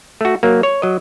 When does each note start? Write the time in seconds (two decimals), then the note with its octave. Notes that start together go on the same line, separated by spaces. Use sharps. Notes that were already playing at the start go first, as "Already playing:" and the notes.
0.21 A3 F#4
0.43 F#3 A#3
0.63 C#5
0.82 F#3 D#5